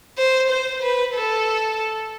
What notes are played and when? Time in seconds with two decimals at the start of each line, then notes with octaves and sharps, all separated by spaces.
0.18 C5
0.50 C5
0.82 B4
1.15 A4